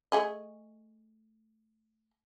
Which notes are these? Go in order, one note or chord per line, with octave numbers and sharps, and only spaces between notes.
A3 G#4 D#5